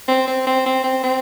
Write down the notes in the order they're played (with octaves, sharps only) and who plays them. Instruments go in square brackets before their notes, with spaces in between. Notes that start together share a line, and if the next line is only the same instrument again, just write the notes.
[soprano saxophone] C4
C4
C4
C4
C4
C4